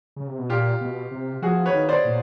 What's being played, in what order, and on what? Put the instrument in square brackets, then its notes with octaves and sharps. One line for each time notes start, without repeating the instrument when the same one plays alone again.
[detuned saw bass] C#3
C3
B2
[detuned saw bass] A#2 [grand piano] F4 G4
[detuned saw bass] B2
C3
[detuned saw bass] F3 [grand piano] F#4 G#4
[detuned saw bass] E3 [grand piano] B4 C#5
[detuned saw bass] D#3
[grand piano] C5 D5
[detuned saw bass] A#2